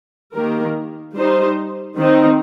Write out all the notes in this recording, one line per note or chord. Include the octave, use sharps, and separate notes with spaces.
D#3 A#3 G4 A#4
G3 D#4 C5
D#3 C4 D#4